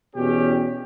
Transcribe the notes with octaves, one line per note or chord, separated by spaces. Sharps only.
E2 B2 C#4 G4